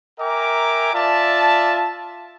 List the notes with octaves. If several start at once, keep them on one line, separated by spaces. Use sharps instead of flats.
A#4 E5 G5 G#5 A#5 D6
F4 D5 E5 A5